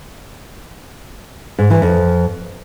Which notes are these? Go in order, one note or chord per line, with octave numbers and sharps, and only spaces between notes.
G#2
E3
F2